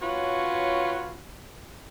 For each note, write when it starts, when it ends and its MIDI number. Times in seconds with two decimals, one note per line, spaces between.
0.02 1.19 61
0.02 1.19 65
0.02 1.19 66
0.02 1.19 71
0.02 1.19 73